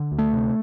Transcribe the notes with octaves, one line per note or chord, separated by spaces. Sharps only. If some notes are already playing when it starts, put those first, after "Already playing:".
Already playing: D3
D2
A3
C3